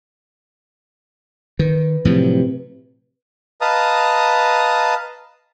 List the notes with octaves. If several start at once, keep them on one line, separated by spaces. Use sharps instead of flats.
D#3 B4
A2 C3 F3 F#3
B4 D#5 F5 A5 A#5 D#6